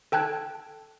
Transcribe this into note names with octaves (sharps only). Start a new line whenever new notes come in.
A4 G5 A5 F#6 G#6